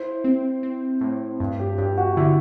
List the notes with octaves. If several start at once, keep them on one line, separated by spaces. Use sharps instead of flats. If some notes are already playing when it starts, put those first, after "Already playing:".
Already playing: E4 C5
C4
C4
A2
G2
G4
G2 G4
F#4
D3 E4